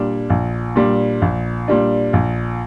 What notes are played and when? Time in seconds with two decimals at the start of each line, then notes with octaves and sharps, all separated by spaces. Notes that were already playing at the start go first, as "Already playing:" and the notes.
Already playing: A#2 G3 D4
0.30 A#1
0.76 A#2 G3 D4
1.22 A#1
1.68 A#2 G3 D4
2.13 A#1